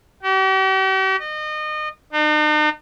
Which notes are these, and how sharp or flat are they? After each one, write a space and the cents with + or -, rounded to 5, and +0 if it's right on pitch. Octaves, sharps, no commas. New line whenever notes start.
G4 -45
D#5 -30
D#4 -45